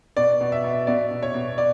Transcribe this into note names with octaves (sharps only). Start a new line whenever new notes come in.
B2 D5
B2
E5
B2
B2 D5
B2
C#5
B2
D5